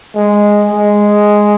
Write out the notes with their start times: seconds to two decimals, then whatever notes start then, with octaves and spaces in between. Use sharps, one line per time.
0.15 G#3
0.71 G#3